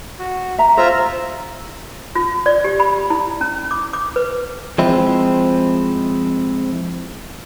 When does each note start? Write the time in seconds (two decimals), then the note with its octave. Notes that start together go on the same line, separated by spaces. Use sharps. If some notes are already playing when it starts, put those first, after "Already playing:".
0.19 F#4
0.58 E5 A#5
0.77 F4 C5 E5 A#5
2.15 F4
2.46 D5
2.64 G4
2.80 B5
3.10 E4
3.41 C#4
3.71 D6
3.93 D6
4.16 B4
4.78 F3 G#3 C4 E4